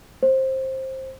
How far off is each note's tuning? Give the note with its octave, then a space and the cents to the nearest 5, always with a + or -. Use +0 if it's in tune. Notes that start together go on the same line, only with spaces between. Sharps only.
C5 +15